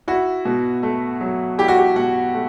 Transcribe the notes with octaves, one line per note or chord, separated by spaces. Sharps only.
E4 F#4
B2
A3
F#3
E4 G4
F#4
G4
B2 F#5
A3